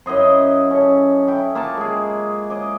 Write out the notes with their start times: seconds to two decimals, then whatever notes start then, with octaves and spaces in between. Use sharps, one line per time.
0.06 F#2 E4 D#5 C6
0.71 C#4 A4
1.28 E4 G5
1.55 A#3 F4 A4 A5
1.77 G#3 G#4
2.50 D#5 D6